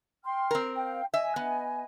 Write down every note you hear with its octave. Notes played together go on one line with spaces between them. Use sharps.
G5 C6 F6
C4 A#4
F5 G5
D#5 E5 G#5
B3